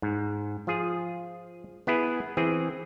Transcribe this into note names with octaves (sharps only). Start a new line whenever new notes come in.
G#2
F3 F4 G#4
B3 E4 G#4 B4
E3 C4 G#4